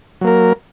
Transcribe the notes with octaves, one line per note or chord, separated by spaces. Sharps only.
F#3 A#3 A#4